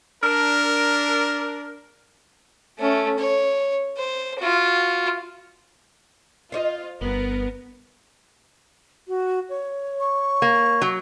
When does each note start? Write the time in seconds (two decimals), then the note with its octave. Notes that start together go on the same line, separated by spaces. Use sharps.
0.24 D4 A#4
2.78 A3 C#4
3.19 C#5
3.98 C5
4.39 F4 F#4
6.52 F4 C5 C#5 D#5
7.01 G1 G2 B3 A#4
9.08 F#4
9.49 C#5
10.00 C#6
10.42 A#3
10.82 F#3